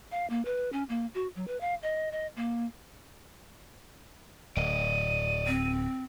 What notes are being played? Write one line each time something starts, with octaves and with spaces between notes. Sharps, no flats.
F5
A#3
B4
C#4
A#3
F#4
F#3
B4
F5
D#5
D#5
A#3
D1 D5 D#5 D#7
C4